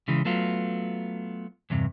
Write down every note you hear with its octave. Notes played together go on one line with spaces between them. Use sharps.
C#3 E3 G#3
F#3 A3 B3 F4
E2 G2 C3